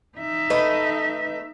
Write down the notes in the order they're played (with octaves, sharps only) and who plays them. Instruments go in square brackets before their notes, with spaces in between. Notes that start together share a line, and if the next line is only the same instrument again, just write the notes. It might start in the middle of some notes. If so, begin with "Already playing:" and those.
[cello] D#4 E5
[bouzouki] A3 B4 D#5